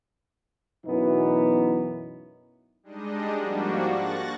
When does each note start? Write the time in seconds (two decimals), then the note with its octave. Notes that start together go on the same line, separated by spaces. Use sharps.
0.86 F#2 B2 E3 B3 D#4 E4
2.83 G3 G#3 D4 D#4 D#5
3.36 G#2 F3 G3 A#3 D4 F#4
3.84 C#6 F#6 A6 A#6